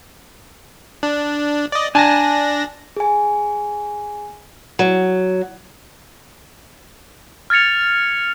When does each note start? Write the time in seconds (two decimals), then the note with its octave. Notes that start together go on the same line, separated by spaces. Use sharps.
1.03 D4
1.72 D5 D#5
1.95 D4 G#5 A5 A#6
2.97 G#4 G#5
4.79 F#3
7.50 F6 G#6 A6 C#7 F7